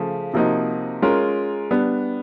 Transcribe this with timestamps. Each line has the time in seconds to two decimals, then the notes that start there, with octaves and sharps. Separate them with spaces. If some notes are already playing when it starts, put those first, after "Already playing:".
Already playing: C#3 F3 A3
0.34 C3 F3 A#3 D#4 F#4
1.02 G#3 C#4 F4 A#4
1.71 G3 B3 D4